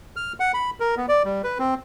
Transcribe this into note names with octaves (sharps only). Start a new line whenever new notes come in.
F6
F#5
B5
A#4
B3
D5
G3
B4
C4